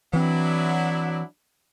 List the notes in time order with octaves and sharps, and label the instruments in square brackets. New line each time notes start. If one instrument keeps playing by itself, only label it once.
[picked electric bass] E3 C4 [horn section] F#3 D4 E4